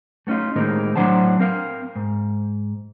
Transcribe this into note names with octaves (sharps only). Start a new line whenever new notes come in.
A3 B3 C#4 D#4 F4
A2 D#3 G#3 A#3 C4 D#4
A2 F#3 D4 C5 F#5 A5
C4 A#4 F5
G#2